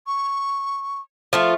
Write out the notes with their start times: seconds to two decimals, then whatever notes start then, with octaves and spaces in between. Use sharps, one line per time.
0.07 C#6
1.33 F3 A3 F4